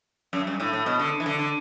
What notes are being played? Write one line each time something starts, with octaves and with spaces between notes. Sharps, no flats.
F#2
G2
A2
A2
B2
D3
E3
D3
D3